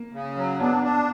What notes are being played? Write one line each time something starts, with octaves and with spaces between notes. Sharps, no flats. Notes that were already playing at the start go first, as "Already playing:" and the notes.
Already playing: A#3
C#3
F#3
B3 D4
D4